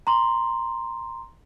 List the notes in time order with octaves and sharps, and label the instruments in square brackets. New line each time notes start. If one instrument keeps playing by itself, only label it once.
[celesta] A#5 C6